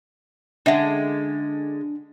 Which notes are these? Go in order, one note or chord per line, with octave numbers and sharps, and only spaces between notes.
D3 G#3 C#4 D4 E5 F#5